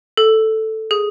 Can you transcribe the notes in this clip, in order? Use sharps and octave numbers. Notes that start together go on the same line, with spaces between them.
A4
G#4